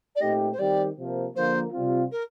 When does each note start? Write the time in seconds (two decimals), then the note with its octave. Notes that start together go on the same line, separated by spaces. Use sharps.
0.15 D5
0.21 A#2 A3 C4 D#4 G4 D#5
0.52 C5
0.59 D#3 G3 C4 G4 D5
0.97 C3 F3 A#3
1.35 D3 F3 A#3 C5
1.73 C3 G3 C4 F4
2.11 A#4